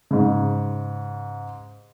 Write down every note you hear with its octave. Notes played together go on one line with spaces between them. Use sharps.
G#2 C#3